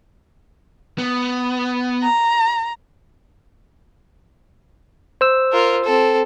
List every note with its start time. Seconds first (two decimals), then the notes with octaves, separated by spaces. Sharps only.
0.98 B3
2.03 A#5
5.21 C5 E6
5.52 F4 A#4
5.84 C4 A4